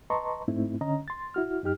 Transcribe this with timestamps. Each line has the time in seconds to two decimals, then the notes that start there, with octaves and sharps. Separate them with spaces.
0.10 B4 D#5 A5 A#5 C6 C#6
0.48 G#2 A3 C4 D#4 E4
0.81 D3 C#4 D#5 A#5
1.08 C6 A6
1.34 E4 F#4 F6
1.63 F#2 D#4 G4 F6